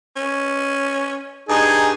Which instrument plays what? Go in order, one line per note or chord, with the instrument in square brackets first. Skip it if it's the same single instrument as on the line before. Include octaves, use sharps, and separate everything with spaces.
[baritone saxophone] C#4
[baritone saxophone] G2 [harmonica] D#4 G#4